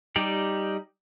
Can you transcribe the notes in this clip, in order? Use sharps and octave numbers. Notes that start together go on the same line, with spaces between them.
G3 D#4 G4 D5